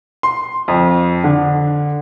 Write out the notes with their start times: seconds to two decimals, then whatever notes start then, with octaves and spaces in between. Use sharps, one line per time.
0.23 C6
0.68 F2
1.24 D3